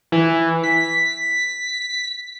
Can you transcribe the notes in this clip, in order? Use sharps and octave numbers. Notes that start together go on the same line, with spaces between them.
E3
B6